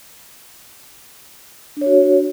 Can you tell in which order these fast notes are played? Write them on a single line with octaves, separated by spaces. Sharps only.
D4 C#5 F#4